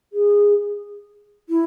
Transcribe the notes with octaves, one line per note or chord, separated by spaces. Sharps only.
G#4
E4